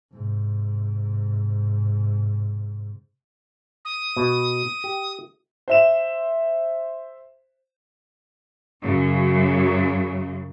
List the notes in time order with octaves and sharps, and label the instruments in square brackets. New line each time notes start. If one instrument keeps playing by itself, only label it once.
[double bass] G#2 C3
[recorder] D#6
[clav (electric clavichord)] B2
G4
[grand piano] C5 E5 E7
[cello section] F#2 C#3